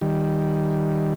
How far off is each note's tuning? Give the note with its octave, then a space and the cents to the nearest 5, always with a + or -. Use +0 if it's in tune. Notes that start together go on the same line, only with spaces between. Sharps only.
D#3 +0 G3 +0